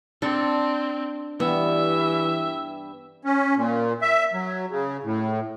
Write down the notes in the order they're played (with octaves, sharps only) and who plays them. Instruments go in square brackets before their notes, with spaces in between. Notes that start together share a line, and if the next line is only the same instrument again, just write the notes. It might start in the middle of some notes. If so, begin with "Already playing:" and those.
[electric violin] C4 [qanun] D4 A4
[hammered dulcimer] G2 G3 [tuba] E3 [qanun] B3 [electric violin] E5
[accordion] C#4
A#2
E5
F#3
C#3
A2